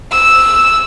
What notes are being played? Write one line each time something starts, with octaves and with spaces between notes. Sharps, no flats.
E6